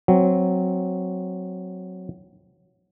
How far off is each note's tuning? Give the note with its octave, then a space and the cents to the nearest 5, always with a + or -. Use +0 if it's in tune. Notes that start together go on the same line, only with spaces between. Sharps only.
F#3 +0 C4 +0